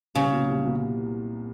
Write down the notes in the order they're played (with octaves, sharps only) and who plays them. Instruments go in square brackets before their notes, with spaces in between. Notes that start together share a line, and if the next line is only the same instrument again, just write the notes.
[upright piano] C2 [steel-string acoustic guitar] C#3
[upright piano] A#2 F#3 B3
C2
A#2 F#3 B3